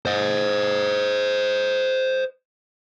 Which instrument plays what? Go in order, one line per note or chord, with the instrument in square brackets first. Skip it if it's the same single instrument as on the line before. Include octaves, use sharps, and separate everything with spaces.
[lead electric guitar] C5 D#5